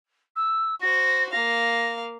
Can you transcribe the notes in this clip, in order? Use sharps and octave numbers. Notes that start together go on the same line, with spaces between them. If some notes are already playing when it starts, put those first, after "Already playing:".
E6
F#4 C5 A#6
A#3 F5 A#6